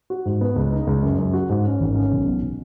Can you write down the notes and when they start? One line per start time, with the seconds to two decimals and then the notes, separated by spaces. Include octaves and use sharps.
0.10 F#4
0.25 G#2
0.41 B3
0.56 C#2
0.72 D#4
0.87 C#2
1.03 F#2
1.18 F#2
1.33 F#4
1.49 G#2
1.65 C#4
1.80 G#1
1.95 C#4
2.11 B1
2.26 B2
2.42 B2